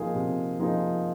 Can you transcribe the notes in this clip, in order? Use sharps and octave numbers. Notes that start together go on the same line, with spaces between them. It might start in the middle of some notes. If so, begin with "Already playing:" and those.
Already playing: C3 F3 A#3 D#4 G#4
C3
F3 A#3 D#4 G#4